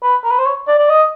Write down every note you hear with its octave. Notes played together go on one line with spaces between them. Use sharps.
B4
A#4
B4
C5
C#5
D5
D5
D#5